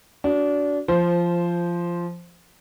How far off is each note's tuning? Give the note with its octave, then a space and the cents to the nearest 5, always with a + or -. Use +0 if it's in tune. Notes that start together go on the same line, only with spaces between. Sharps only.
D4 -25 F#4 +0
F3 -15 C5 +0